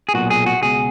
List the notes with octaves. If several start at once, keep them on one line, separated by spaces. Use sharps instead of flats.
G#4
B1 A#2 F#4
G#4
F#4
C#2 B2 G#4